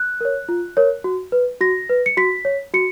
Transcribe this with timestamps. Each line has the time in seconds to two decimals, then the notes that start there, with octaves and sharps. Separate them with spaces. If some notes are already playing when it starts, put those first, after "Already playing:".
Already playing: F#6
0.21 A#4 C#5
0.49 F4
0.77 A#4 C#5
1.04 F#4
1.32 B4
1.61 F#4 A#6
1.89 B4
2.06 C#7
2.17 F#4 B6
2.45 C#5
2.74 F#4 C#7